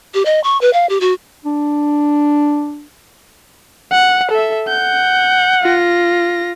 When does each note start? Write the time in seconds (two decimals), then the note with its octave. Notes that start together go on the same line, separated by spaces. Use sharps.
0.14 G4
0.25 D#5
0.44 C#6
0.61 B4
0.73 F5
0.89 G4
1.01 F#4
1.44 D4
3.92 F#5
4.31 A4 E5
4.68 F#5 G6
5.62 F4 A#6